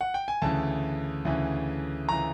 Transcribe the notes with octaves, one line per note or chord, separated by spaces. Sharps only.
F#5
G5
G#5
D2 C#3 E3 A5
D2 C#3 E3
C#3 E3 A#5